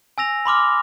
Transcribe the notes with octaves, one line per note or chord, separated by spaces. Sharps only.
G#5 E6 A#6 F7
B5 C6 D6 F6